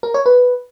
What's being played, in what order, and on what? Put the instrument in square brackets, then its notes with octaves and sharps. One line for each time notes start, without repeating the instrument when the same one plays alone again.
[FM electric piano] A#4
C#5
B4